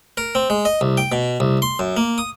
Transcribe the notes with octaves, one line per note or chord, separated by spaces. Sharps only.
A#4
C4
G#3
D#5
C2
G5
B2
C2
C6
F#2
A#3
D#6